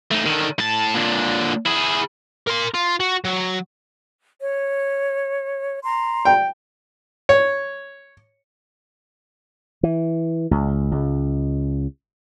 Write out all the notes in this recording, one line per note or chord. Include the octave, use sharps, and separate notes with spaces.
A3 D#4
D3 D#3
A2 A5
A#2 D3
E4 G#4
A#4 C6
F4
F#4
F#3
C#5
A#5 C6
G5
C#5
E3
C#2
C#2